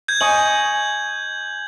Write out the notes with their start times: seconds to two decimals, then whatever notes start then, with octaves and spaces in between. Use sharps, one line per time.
0.08 G6 G#6
0.21 D#5 G#5 C#6 F#7